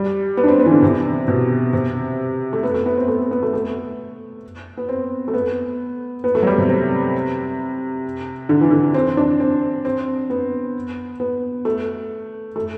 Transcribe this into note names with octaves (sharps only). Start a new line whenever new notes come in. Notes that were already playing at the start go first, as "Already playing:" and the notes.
Already playing: G3
B3
D4
C4
B3
E3
D3
C3
B2
C3
A3
B3
A3
B3
C4
A3
B3
B3
A3
A3
B3
C4
A3
B3
B3
A3
F#3
G3
C3
C3
D3
E3
D3
C4
D4
C4
C4
B3
B3
A3
A3